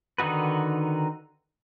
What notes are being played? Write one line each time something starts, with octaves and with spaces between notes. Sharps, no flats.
D3 D#3 D#4 F#4 B4